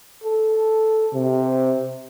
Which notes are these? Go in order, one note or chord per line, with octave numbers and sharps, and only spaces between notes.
A4
C3